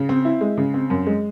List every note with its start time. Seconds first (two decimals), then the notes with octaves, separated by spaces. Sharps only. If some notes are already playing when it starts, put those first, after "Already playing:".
Already playing: C#3
0.09 C4
0.25 E4
0.41 G#3
0.57 C#3
0.74 C4
0.90 F#2
1.07 G#3